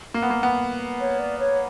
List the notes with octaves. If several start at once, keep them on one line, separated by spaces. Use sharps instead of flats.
A#3
B3
A#3
B3
C#5
D5
C#5